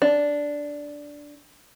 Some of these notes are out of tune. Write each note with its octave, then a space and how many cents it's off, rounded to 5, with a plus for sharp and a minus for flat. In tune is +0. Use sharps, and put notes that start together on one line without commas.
D4 -5